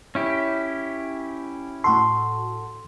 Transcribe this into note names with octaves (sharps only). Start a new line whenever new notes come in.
C#4 E4 G4
A2 F#4 A4 C6